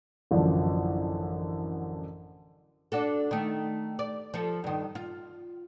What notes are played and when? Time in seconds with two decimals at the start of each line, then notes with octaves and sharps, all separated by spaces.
0.31 A1 F#2 D3 F3
2.92 D4 F#4 A4
3.31 D#3 A3
3.99 D5
4.34 F3 A4
4.64 G2 D#3
4.95 F4